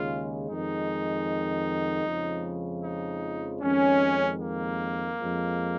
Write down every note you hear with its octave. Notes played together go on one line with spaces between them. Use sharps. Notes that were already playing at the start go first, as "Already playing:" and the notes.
Already playing: D#2 C#3 G#3 F4
F2 D#3 G#3 D#4
F2 C#3 F3 G#3
D#4
F2 D#3 G#3 C#4
A#3
F2 F3 G#3